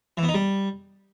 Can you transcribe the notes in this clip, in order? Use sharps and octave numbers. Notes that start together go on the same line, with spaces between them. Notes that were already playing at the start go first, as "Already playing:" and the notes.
E3
B3
D#4
G3